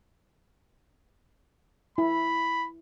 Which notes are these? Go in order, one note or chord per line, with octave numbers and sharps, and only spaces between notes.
E4 B5